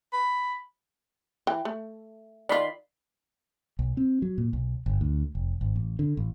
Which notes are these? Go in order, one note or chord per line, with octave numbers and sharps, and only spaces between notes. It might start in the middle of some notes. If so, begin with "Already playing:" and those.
B5
E3 G5
A3
D#3 F4 D5 B5 C6
B1
C4
F#3
A#2
B1
G1
D2
F1
G#1
A1
D3
A1